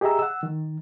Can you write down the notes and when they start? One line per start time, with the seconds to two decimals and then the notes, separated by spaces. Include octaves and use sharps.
0.01 G4 G#4 D#5 E5 A#5 E6
0.19 F#5 E6
0.43 D#3